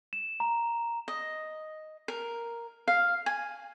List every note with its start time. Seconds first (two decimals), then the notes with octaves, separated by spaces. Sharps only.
0.13 E7
0.40 A#5
1.08 D#5
2.08 A#4
2.88 F5
3.26 G#5